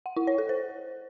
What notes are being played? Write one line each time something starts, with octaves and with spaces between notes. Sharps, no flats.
F#5
E4
C#5
A4
C5